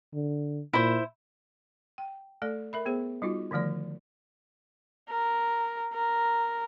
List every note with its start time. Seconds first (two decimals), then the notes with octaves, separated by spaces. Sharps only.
0.14 D3
0.73 A#2 E4 C5
1.98 G5
2.42 A3 A4 D5
2.73 A#4 E5 B5
2.86 B3 G#4 C5
3.22 G3 D#4 F4 F#4
3.51 D3 D#3 F3 A3 D5
5.10 A#4
5.94 A#4